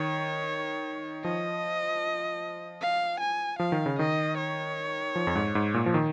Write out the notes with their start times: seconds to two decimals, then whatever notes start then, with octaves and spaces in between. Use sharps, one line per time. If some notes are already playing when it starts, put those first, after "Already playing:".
Already playing: D#3 C#5
1.24 F3 D#5
2.81 F5
3.20 G#5
3.59 F3 F5
3.72 D#3
3.86 C#3
3.99 D#3 D#5
4.37 C#5
5.15 F3
5.27 F2
5.35 G#2
5.55 G#2
5.74 A#2
5.86 F3
5.94 D#3